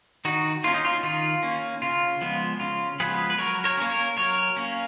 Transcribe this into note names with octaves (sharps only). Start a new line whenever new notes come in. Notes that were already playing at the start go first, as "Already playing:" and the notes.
D#3 D#4 F#4
A#3 C#4 F4
D#4
F4
D#3 F4
A#3 C#4
C#3 F4
F3 G#3 B3
C#3 F4
F3 G#3 B3 G#4 B4
B4
F#3 A#4 C#5
A#4 C#5
A#3 C#4
A#4 C#5
F#3 A#4 C#5
A#3 C#4